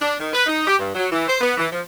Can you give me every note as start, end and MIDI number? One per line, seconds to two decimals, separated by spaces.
0.02 0.15 62
0.19 0.29 51
0.33 0.46 71
0.46 0.66 63
0.67 0.78 67
0.79 0.91 43
0.95 1.09 54
1.11 1.25 52
1.28 1.41 72
1.41 1.54 59
1.58 1.67 52
1.73 1.81 53